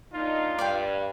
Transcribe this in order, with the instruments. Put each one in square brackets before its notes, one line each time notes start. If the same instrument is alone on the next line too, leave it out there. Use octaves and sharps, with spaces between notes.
[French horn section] A#2 D4 D#4 [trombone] F4
[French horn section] G2 [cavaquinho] D5 F5 G5